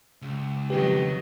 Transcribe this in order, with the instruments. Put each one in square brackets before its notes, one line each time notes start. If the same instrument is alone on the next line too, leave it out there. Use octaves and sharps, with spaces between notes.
[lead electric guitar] C#2
[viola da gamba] F2 D#3 F#3 [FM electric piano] G4 [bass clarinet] B4